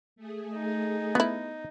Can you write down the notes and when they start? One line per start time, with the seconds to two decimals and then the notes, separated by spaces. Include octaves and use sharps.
0.16 A3 G#4
0.55 D#4
1.15 B3 E4 F#4